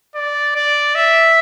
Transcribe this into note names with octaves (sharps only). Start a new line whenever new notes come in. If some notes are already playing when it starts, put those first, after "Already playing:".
D5
D5
E5